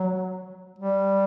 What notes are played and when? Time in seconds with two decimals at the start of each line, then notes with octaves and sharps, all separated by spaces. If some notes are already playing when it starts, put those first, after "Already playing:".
Already playing: F#3
0.79 G3